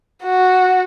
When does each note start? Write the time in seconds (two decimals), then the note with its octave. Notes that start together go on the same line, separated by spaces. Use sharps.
0.24 F#4